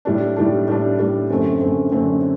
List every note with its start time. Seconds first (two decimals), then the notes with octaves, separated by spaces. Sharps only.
0.05 A2 G3 D4
0.36 A2 G3 D4
0.67 A2 G3 D4
0.98 A2 G3 D4
1.30 F#2 D3 A3 C4
1.61 F#2 D3 A3 C4
1.92 F#2 D3 A3 C4